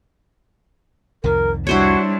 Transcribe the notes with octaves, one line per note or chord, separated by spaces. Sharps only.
C2 F2 D#3 A#4
G3 D4 E4 F#4 C5 C#5